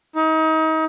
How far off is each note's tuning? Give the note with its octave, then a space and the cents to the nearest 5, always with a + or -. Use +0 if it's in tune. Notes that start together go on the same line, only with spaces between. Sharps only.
D#4 +30